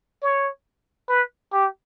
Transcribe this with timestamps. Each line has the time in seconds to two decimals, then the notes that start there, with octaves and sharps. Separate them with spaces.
0.22 C#5
1.09 B4
1.53 G4